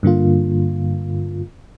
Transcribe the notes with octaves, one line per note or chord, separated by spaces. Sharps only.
G2 D3 A#3 F4